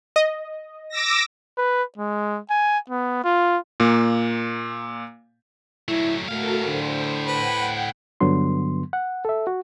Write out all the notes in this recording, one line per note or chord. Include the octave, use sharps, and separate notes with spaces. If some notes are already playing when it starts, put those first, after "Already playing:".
D#5
D6 E6 A#6
B4
G#3
G#5
B3
F4
A#2 A#3
F#3 A3 E4
A2 A3 F#4 A4 A#4 F5
D3 C5
B4 F#5 G5
G2 D3 F#3 B3 C6
F#5
A4 E5
F#4